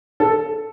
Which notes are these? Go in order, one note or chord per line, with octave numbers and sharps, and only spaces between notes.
A4